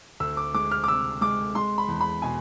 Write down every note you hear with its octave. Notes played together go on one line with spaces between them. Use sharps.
D2 E6
D6
G#3 D6
F6
D6
C3 E6
G#3 D6
G#3 C6
B5
E2
B5
B2 G#5